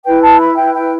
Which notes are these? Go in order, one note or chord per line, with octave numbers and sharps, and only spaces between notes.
E4 B4 G5
A5
B5
G5
G5